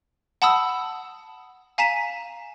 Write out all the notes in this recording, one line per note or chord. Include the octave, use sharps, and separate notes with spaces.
F#5 A5 B5 D#6 E6
F5 G#5 A#5 B6 D#7 E7